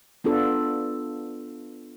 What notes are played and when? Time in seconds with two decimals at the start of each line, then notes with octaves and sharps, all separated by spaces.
0.24 B3 D4 F4 A4